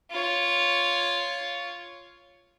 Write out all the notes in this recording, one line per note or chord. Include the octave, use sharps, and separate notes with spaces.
F4 C#5